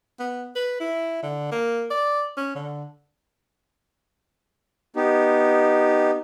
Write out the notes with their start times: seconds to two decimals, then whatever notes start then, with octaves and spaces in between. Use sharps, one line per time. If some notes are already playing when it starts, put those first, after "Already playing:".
0.19 B3
0.56 B4
0.80 E4
1.23 D3
1.52 A#3
1.91 D5
2.37 C#4
2.55 D3
4.96 B3 D#4 G4